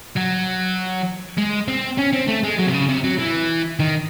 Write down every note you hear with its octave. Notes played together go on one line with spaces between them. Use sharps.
F#3
G#3
C4
C#4
C4
A3
G#3
F#3
C3
C#3
C3
F#3
E3
D#3